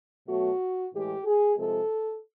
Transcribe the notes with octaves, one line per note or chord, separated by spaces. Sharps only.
B2 F#3 A3 F#4
A2 E3 G#3 G4
G#4
C3 F3 G#3 A4